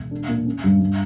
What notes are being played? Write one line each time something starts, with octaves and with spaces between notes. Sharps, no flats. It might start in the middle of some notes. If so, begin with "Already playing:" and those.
Already playing: E1
D4
A#2
C#4
G2
G2